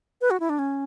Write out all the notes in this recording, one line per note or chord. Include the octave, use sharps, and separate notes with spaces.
B4
F#4
E4
D4
C#4